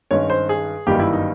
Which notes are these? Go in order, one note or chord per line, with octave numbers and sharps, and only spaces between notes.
G2 D#3 G#3 C#4 C#5
C5
G#4
G1 F#2 D#3 G3 A#3 G4
E4
D#4